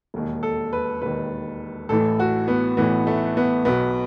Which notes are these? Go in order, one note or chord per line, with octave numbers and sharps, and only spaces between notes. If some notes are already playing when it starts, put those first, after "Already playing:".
E1 D#2 D#3
A4
B4
E1 D#2 D#3 B4
A1 A2 E3 A4
F#4
B3
A1 A2 E3 B3
A3
B3
B1 B2 B3